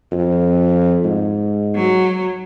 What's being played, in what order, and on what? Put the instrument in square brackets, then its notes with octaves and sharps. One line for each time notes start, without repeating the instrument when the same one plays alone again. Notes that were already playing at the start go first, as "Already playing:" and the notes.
[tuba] F2
G#2
[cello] F#3